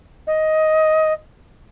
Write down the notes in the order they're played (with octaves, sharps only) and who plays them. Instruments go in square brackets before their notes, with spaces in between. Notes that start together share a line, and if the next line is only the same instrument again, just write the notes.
[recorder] D#5